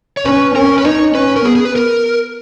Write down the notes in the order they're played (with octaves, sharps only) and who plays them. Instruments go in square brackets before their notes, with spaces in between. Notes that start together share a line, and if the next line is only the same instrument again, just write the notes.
[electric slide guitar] C#5
[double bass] C#4 [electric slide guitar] B4
[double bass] C#4 [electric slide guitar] A#4
[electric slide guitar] B4
[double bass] D#4 [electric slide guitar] C#5
[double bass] C#4 [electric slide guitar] B4
[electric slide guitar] A#4
[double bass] B3 [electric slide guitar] G#4
[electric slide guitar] G#4
B4
A#4